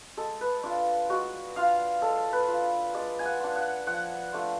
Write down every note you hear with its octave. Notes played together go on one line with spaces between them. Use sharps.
G#3 A4
B4
D4 F4 D5
G#3 F#4
D4 F4 F5
G#3 A4
B4
D4 F4
G#3 D5
G#5
F#5
D4 F4
F#5
F3 F#5
A3 D4 F4